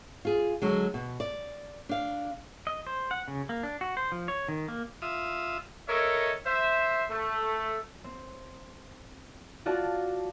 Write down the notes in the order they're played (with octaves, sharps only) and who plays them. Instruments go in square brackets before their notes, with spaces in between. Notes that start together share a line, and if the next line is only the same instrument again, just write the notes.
[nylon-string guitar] F4 G#4
D3 F#3 G#3
B2
D5
D4 F5
[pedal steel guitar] D#5
C5
F#5
C#3
A#3
D4
F#4
C5
F3
C#5
D#3
A#3
[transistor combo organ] F4 E5 D#6
[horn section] A4 A#4 C#5 D#5 E5
C5 E5
A3
[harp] C4
F4 F#4 D5 A5